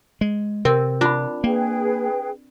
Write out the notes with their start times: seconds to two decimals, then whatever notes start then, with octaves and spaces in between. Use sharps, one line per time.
0.21 G#3
0.65 C3 C4 A#4
1.01 D4 F4 B5
1.44 A#3 G#4 B4 G5